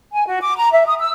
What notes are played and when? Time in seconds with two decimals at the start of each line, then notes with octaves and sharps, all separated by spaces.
0.11 G#5
0.27 F#4
0.41 D6
0.56 A#5
0.71 E5
0.86 D#6
0.99 E6